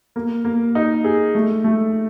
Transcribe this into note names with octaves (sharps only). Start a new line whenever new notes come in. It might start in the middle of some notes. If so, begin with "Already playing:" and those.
A#3
A#3
D#4
G#4
A3
A3